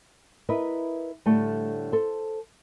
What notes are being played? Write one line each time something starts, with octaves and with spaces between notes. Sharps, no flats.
E4 A#4 B4 D#5
A2 D3 G3 A3
A4 C5